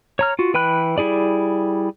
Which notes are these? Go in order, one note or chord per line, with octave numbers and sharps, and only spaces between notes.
C#5 A#5 F6
F4 F#4
E3 B4 G5 B5 F#6
G3 E4 G#4 D5